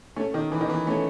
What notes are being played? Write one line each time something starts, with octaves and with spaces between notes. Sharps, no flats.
A3 C#4
D#3
E3
D#3
E3
A3 C#4